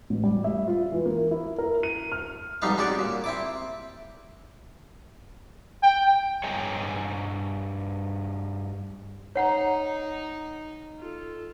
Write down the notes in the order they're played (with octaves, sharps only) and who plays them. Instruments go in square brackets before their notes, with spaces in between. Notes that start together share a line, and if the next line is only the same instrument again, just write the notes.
[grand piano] A1
G3
E5
F4
E3
A#3
E4
A#4
D#7
F6
[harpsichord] F2 G#2 G3 B3 D#4 F5
G#3 C#4 F#4 G4 D5
A#2
C4 E4 D6
[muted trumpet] G5
[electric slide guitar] G2 G#4 C#5 D#5 G#5 A#5
[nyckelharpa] D#4 [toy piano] C#5 F#5 A#5
[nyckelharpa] F4 A4